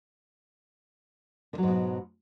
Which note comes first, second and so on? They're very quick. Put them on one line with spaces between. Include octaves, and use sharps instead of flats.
D3 F#3 G#2 B2